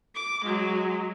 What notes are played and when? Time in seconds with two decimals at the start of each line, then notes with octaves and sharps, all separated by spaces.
0.15 D6
0.45 F#3 G#3